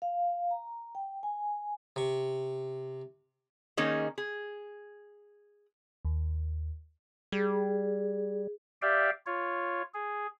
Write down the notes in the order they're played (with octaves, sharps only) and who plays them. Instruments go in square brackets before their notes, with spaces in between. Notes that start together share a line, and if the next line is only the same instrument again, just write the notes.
[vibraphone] F5
A#5
G5
G#5
[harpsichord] C3 C#6
[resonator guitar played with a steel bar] D#3 A#3 C#4 D#4 G#4
G#4
[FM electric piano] D#2
[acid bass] G3 [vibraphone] G#4
[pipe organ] G4 D5 E5 F5 G5
F4 C#5
G#4